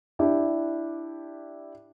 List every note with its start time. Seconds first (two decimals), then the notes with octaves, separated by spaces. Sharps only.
0.19 D4 E4 G4